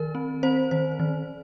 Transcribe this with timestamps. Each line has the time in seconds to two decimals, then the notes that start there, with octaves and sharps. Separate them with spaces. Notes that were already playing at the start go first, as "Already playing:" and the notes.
Already playing: D#3 A#4
0.15 C4
0.43 C4 C5
0.71 D#3 C5
0.99 D#3